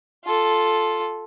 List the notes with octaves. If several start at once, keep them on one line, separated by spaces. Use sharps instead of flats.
F4 A4